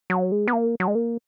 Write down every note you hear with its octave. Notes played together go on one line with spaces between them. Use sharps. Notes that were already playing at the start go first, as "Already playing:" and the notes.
F#3
G#3
B3
A#3
F#3
G#3
A#3